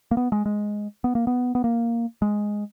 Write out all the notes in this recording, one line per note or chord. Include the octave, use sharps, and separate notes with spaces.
A#3
B3
G#3
G#3
B3
A#3
B3
B3
A#3
G#3